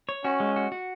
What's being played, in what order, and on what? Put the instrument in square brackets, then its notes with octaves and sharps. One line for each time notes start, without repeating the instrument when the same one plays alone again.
[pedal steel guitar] C#5
[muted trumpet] C#4 [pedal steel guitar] F#4
[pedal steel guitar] G#3
F#4
F#4